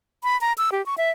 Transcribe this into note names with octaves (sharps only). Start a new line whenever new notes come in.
B5
A#5
E6
G4
C#6
E5